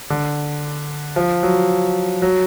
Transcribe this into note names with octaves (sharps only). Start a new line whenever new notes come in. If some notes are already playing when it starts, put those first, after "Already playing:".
D3
F3
F#3
F#3